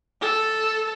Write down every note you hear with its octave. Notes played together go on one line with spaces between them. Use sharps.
A4